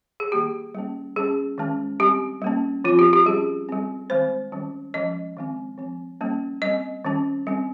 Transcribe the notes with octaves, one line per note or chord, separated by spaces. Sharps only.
G#4
D#3 G3 A#3 G4
G3 A#3 C#4
G3 C#4 G#4
D#3 G#3 C#4
G3 C4 G4
G3 A#3 C#4
F3 C4 F4
G4
G4
G3 C#4 G#4
G3 C4
D#3 G#3 C4 C5
D#3 G3 C#4
F3 G#3 C#4 D#5
D#3 G#3 C4
F3 C4
G3 A#3 C#4
G3 C4 D#5
D#3 G3 C#4
G3 C4